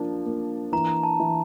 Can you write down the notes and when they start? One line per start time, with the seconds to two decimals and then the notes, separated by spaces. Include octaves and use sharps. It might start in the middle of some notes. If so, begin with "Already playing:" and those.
Already playing: F3 A#3 D4
0.26 A#3
0.72 E3 A#5
1.03 A5
1.20 E3